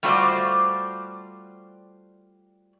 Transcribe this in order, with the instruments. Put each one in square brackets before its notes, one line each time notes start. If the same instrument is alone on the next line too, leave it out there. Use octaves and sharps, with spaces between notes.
[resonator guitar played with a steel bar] G3 A3 F4 F#4 C5 D5